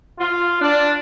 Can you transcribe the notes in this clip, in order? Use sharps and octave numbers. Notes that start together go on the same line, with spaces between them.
F4
D4